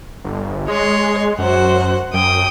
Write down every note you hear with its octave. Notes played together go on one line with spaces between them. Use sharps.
G1
G#3 C#5 C6
F#2 F#4 C5 F#5
F#2 G5 D#6